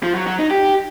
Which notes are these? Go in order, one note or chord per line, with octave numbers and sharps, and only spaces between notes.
F3
F#3
F#3
D#4
G4